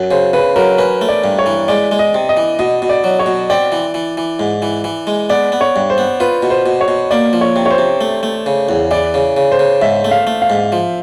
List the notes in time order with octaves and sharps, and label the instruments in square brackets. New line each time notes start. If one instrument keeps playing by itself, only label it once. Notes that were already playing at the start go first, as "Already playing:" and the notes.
Already playing: [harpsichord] F#2
[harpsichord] C#3 [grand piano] C5
[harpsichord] C#3 [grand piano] B4
[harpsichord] F#3 [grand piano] A#4
[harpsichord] C#4 [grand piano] B4
[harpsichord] A3
[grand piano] D5
[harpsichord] G2
[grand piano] C#5
[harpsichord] E3
[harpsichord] G#3 [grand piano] D5
[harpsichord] G#3
[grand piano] D#5
[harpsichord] C3
[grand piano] D#5
[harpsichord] E3
[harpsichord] B2 [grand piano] D#5
[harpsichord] B2
[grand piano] D5
[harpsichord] F#3
[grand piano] C#5
[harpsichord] B2
[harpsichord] C4 [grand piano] D5
[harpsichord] E3
E3
E3
G#2
E3
E3
G#3
[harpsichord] B3 [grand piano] D5
[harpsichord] B3
[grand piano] C#5
[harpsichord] G2
[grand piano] C5
[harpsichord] B3
[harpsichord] F4 [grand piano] B4
[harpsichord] B2
[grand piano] C5
[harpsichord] B2
[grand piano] C#5
[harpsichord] B2
[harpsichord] A#3 [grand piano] D5
[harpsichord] F3
[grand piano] C#5
[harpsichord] C3
[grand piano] C#5
C5
[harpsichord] C3
A3
A3
C#3
E2
[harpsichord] E3 [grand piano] D5
[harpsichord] C#3
C#3
[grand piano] C5
[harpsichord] C#3
[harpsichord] G#2 [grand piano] E5
[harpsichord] A3
[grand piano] F5
[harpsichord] A3
[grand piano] F5
[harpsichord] G#2
F3